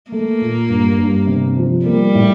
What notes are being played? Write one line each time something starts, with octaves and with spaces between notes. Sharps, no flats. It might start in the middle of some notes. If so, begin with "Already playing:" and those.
A3 A#3
A#2
G2
G2
C3
F3
G3 A#3
A2